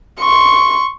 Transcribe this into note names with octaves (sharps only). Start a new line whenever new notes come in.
C6 C#6